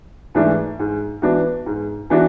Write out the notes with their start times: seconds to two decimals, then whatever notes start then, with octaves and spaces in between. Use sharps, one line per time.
0.35 G#2 E3 A3 D4
0.79 G#2
1.22 E3 B3 D4 F#4
1.66 G#2
2.10 E3 B3 D4 F#4